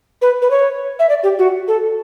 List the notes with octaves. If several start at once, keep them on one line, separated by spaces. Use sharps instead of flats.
B4
B4
C#5
E5
D5
G4
F#4
A4